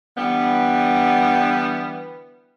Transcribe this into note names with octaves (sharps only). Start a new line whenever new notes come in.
D3 E3 G3 B3